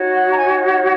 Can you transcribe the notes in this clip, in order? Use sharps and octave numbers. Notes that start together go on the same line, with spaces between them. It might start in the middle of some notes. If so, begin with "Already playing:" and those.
Already playing: D#4 F#4 C#5
F#5
A#5
G#5
F#5